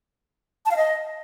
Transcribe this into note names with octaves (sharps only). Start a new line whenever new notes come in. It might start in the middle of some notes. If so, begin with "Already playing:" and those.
A5
F5
D#5